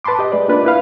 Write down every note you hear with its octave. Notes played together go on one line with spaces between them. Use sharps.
B4 A5 B5 C6 D6
G4 D#5
G#3 B4 D5
A#3 D4 F4 B4 D5
E4 B4 F5